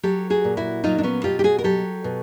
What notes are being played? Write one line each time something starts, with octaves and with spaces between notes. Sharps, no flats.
F#3 G4 A4
F#4 G#4
A#2
E4 F#4
F#3 D#4 F4
D4
B3 C#4
B2 F4 G4
G4
F#4 G#4
A#4
F#3 G4 A4
B2